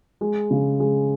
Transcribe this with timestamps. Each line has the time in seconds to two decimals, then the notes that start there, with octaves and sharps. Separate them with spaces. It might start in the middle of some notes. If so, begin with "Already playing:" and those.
0.21 G#3
0.51 C#3
0.80 G#3